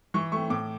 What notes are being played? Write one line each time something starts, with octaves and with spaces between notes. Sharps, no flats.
E3 C#6
A3 C4 C#6
A2 D6